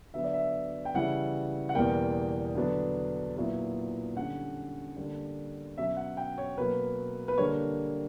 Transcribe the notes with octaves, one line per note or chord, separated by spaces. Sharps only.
D3 F#3 B3 E5
D5
E5
G5
C#3 E3 G3 C#4 E4 F#5
F#5
E2 B2 G3 A#3 G5
D3 F#3 B3 D4
A#2 F#3 B3 E4
D3 G3 C#4 F#5
D3 G3 A#3 D4
B2 F#3 C#4 E5
F#5
G5
C#5
B2 F#3 A#3 B4
B4
D3 G3 A#3 C#5